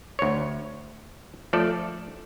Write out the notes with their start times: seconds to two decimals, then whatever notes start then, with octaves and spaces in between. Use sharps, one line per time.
0.19 D2 C#5
1.53 F3 A3 A4 D5